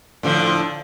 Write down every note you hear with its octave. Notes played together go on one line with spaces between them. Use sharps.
A2 D3 F3